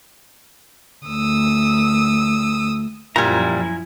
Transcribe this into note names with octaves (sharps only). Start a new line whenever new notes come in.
D2 D#6 E6
F#2 A#2 F3 G3 E4 G#5 A#5